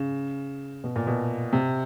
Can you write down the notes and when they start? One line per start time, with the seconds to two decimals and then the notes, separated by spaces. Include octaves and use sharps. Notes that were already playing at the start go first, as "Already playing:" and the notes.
Already playing: C#3
0.84 B2
0.96 A#2
1.07 B2
1.53 C3